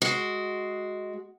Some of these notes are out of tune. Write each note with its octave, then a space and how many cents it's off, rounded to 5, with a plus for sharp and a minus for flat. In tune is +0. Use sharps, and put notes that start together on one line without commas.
G#3 +10 F#4 +0